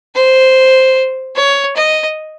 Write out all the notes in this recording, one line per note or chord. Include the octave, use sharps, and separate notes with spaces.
C5
C#5
D#5